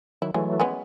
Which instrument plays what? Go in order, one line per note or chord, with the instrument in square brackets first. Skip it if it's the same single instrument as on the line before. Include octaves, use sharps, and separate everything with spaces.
[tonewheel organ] D#3 F#3 [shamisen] E4
[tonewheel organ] E3 F#3 A3 [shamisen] G#3
[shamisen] G#3 B3 C#4